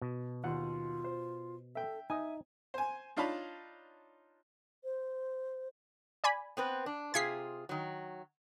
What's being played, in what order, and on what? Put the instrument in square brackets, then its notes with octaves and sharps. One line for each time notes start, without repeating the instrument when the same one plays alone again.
[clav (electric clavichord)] B2
[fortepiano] D#2 F#5 [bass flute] F4
[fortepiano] C5
[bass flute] A4 [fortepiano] E5 G5
[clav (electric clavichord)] D#4 [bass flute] E5 [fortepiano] G#5 D#6
[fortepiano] C5 G#5
D4 D#4 F4 C#5 A5 B5
[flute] C5
[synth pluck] D5 G#5 B5
[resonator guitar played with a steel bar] B3 C4 B4
D4
[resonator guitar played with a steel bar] C3 F4 G#4 [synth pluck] G#6 B6 C7
[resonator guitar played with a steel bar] D#3 F#3